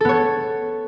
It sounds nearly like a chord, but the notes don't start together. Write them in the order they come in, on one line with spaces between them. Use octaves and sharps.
A4 B3 C#5